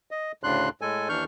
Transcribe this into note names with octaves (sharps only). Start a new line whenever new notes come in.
D#5
D2 A2 C#3 D4 C6 F#6
A2 G#3 A4 G#5
D#2 E3 D4 C#6 F6 G6